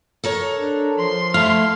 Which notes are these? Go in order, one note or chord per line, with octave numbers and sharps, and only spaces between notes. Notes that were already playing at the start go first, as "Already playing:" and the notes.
A4 A#4 C#5
D4
F3 C6
A3 E4 F5